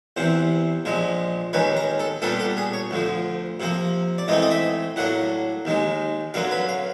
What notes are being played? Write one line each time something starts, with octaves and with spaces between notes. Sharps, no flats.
E2 C3 E3 C5
A#1 A#2 F3 G#3
D#2 D#3 G#3 C#4 B4
A#4
A4
A#2 G3 B3 D4 A4
A4
G#4
C#5
D2 D3 F3
C3 F3 A#3
D5
G#2 E3 A3 C4 D#5
D#5
E5
A2 F#3 A#3 D4 F#5
D#2 D#3 G#3
F#2 D3 F#3 A#3 F5
B4
F5